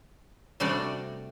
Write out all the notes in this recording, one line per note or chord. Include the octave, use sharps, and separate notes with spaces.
C3 G3 A3 D4 F#4 D5